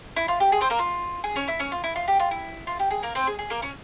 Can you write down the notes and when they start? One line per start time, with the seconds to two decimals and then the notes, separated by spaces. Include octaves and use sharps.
0.16 E4
0.28 F4
0.40 G4
0.52 G#4
0.61 C4 C5
0.70 A#3 A#4
0.79 F4
1.24 G#4
1.36 C#4 C#5
1.48 E4 E5
1.59 C#4 C#5
1.72 F4
1.84 E4
1.96 F4
2.08 G4
2.20 F4
2.31 E4
2.67 F4
2.79 G4
2.91 G#4
3.03 A#3 A#4
3.15 C4 C5
3.27 G#4
3.39 G#4
3.50 A#3 A#4
3.62 C#4 C#5